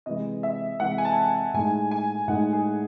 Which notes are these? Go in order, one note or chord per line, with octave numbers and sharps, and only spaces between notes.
C3 E3 G#3 D#5
E5
C3 E3 G#3 F#5
G#5
A5
A2 G#3 D#4 G#5
G#5
A2 G#3 D#4 F#5
G#4